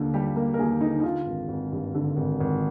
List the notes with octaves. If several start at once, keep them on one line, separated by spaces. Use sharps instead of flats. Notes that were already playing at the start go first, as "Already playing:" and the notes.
Already playing: D#2 D3 A#3
G3 G4
A#3
A#4
D#2 G#4
D3 D#4
D#4
D3 F4
G#1
G#1
G2
D3
G#1
G#1